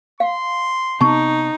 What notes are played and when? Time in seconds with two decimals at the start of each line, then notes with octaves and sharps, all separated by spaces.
0.20 F5 C6
1.01 C3 B3 C4 D#4 A5 C#6